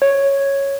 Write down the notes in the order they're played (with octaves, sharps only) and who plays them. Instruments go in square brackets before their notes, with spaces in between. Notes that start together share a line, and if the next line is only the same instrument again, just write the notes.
[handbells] C#5